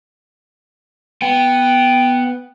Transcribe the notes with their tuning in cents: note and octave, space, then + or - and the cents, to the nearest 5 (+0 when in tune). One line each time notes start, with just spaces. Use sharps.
B3 +0 G5 +0